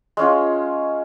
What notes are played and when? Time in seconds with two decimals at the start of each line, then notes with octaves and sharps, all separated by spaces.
0.17 G#3 C#4 F4